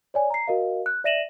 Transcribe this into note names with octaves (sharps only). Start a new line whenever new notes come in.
C#5 D5 G#5
A#5 C7
F#4 A#4 D#5 F5
F#6
D5 E5 A#6 D#7 E7 F#7